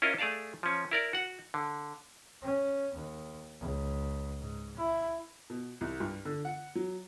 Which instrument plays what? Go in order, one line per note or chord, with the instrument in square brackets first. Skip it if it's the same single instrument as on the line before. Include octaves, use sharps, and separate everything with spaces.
[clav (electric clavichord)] C#4 E4 F4 A#4 D#5
A3 G#4 D5 F5 A5
F3 C#4
E4 A#4 D5
F#4 F#5
D3
[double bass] C#4
D#2
C#2
G#2
E4
[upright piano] B2
C2
G2
D3
F#5
F#3